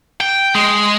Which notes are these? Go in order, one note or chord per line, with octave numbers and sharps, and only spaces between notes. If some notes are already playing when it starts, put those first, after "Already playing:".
G5
G#3